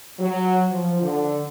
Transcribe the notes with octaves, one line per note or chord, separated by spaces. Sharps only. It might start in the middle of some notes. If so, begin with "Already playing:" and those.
F#3
F3
D3